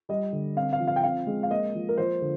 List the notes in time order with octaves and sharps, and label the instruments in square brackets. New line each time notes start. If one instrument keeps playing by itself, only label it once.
[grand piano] G3 D#5
D3
C4 F5
F5
F3
F5
G5
C4 F5
G#3
F5
A#3 D#5
F3
A#4
F3 C5
D3